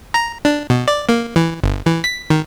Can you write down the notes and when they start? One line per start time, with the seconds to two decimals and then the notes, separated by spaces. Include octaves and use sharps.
0.14 A#5
0.45 D4
0.70 B2
0.88 D5
1.09 A#3
1.36 E3
1.64 G1
1.86 E3
2.04 B6
2.30 D#3